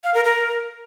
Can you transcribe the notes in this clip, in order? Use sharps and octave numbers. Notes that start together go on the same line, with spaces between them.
F5
A#4
A#4